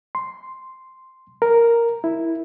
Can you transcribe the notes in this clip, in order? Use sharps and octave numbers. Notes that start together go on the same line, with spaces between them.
C6
A#4
E4